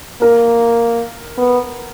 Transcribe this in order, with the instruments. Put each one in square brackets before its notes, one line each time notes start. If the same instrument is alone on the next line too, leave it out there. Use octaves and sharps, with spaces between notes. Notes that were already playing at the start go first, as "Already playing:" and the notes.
[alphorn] A#3 [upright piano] A#4
[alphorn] B3